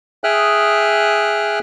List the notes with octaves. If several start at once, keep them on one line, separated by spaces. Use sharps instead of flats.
G#4 E5 G5 D#6 F6 F#6